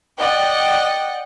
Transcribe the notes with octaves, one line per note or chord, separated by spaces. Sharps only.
D5 D#5 F#5 G5